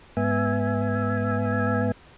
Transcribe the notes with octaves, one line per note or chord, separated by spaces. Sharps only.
G#2 B3 E5 G#5